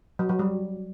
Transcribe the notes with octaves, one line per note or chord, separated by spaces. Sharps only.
F#3
F#3
G3